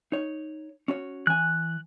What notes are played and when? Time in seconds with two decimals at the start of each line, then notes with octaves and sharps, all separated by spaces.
0.12 D#4 C#5
0.88 C#4 F#4 C#5
1.27 E3 G#5 F#6